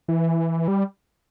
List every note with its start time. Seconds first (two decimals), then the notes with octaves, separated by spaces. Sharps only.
0.08 E3
0.68 G3